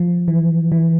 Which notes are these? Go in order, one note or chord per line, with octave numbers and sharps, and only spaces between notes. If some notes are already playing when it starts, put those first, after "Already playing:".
Already playing: F3
E3
E3